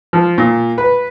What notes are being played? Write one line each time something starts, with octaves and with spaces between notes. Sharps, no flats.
F3
A#2
B4